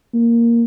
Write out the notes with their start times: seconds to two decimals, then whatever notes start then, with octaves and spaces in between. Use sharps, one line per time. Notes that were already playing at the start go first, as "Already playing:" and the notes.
0.14 A#3